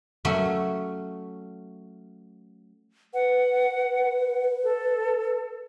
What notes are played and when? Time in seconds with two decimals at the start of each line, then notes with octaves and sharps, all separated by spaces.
0.25 F#3 A3 C#4 E5
3.14 B4 F#5
4.64 A4